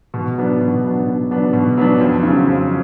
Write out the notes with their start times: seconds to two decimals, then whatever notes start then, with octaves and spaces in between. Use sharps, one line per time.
0.14 B2
0.37 F#3 B3 D4
0.61 B2
0.84 F#3 B3 D4
1.06 B2
1.31 F#3 B3 D4
1.53 B2
1.77 F#3 B3 D4
2.00 F2
2.23 C#3 F#3
2.47 F2